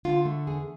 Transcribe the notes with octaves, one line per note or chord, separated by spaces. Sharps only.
D3 F4
A3
E2 G#4